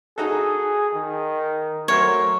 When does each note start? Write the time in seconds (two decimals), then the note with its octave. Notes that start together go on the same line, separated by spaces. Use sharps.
0.18 D#4 F#4 G#4 A4
0.94 D#3
1.88 F#3 A3 A#4 C5 C#5